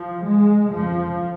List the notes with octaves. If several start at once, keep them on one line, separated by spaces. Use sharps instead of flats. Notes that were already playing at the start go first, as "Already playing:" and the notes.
Already playing: F3
G#3
F2 C#3 F3